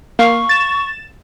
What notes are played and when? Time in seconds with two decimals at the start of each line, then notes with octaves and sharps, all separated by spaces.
0.19 A#3 F5 C#6
0.49 A6 E7